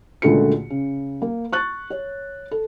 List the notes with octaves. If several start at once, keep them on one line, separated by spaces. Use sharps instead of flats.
C#2 A#2 D3 A3 F#4 C#7
C#3
A#3
C#6 F#6 A6
C#5
A4